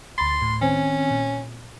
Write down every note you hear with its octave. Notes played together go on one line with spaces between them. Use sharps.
D2 B5 C6 A6
A2
D#3 C4 C#4 G#5
A#2